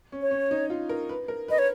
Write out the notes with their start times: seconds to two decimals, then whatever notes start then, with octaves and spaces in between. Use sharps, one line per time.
0.12 C#4
0.22 C#5
0.31 C#4
0.51 D#4
0.70 F4
0.89 A#4
1.09 B4
1.28 A#4
1.48 B4 D#5
1.59 C#5